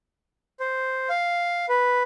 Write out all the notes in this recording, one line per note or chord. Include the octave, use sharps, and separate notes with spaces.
C5
F5
B4